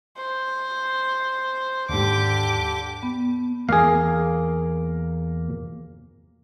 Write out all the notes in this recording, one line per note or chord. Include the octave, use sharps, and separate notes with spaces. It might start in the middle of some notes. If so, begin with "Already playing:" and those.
C5
D#2 G#2 D3 G4 D6
B3
E2 A#3 G#4 F5